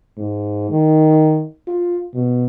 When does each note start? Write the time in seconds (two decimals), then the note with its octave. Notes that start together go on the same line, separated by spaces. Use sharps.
0.17 G#2
0.71 D#3
1.68 F4
2.14 B2